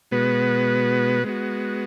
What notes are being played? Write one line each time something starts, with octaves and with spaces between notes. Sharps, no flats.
B2 G#3 B3 F#4 B4
G#3 B3 F#4